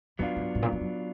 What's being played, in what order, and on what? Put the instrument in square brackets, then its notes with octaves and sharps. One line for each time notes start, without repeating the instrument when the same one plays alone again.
[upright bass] F#2 [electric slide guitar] F#3 B3 D4 F4
[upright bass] G#2
G#2
A#2
G#2
F#2